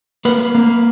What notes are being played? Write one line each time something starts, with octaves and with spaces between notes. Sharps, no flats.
A#3 B4
A#3